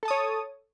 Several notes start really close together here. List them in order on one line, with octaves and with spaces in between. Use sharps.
A4 A5 D#6 C#5